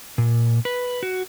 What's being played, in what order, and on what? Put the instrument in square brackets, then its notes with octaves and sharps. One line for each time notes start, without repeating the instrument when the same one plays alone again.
[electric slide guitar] A#2
B4
F#4